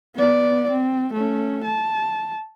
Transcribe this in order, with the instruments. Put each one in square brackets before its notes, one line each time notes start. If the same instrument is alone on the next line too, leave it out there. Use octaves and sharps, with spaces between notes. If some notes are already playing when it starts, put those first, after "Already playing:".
[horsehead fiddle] B3 D5
C4
A3 C#4
A5